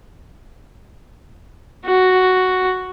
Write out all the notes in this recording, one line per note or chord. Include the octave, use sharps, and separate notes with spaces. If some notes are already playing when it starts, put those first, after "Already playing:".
F#4